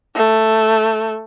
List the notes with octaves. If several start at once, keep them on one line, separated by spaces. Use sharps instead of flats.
A3